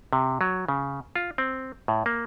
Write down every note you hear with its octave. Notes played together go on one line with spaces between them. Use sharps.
C3
F#3
C#3
F4
C4
A2
A#3